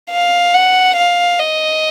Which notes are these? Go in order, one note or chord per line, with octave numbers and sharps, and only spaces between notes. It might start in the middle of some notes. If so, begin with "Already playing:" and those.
F5
F#5
F5
D#5